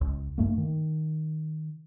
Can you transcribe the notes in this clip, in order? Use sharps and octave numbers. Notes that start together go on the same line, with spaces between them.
C#2
G2 A3 A#3
D#3